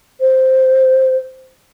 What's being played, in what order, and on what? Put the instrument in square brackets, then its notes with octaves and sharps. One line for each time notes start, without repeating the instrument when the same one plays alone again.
[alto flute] C5